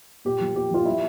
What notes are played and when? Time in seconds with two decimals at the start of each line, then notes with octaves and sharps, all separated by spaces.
0.25 A#2 G4
0.41 F3
0.55 A#2 G4
0.71 F3 F4
0.86 G3 E4